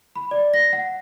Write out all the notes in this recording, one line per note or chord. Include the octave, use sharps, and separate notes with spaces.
B5
D5
A#6
F#5